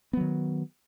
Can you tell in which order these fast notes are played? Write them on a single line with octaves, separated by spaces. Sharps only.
B3 F#3 D#3